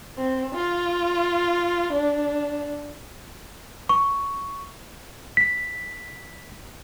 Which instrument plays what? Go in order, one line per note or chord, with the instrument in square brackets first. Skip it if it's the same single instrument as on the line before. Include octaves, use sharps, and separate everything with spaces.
[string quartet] C4
F4
D4
[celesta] C#6
[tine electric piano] B6